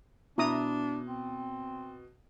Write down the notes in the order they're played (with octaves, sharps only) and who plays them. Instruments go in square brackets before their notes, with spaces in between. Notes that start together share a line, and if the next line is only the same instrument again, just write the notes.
[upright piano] B2 [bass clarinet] D4 [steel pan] E4 A#5 D#6
[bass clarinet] C4